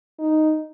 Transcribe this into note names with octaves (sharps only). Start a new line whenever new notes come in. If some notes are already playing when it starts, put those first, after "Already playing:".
D#4